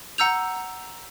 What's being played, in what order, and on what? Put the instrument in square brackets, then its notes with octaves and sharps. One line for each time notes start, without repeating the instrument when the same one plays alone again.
[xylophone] F#5 A#5 E6 G6 F7